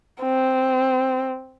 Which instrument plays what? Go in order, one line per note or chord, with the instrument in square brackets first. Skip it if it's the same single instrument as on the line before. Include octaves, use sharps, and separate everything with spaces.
[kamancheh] C4